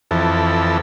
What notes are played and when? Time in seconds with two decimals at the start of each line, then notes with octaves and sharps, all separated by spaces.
0.11 F2 E3 A4